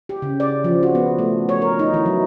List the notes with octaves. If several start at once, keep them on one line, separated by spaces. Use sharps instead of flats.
G4
C#3
D5
F3
F#4
B3
A3
C#5
A#4
D#4
E3
F#3